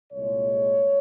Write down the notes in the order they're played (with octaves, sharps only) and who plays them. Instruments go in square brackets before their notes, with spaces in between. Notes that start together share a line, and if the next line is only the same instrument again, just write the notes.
[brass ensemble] C2 A#2 G#3 C#5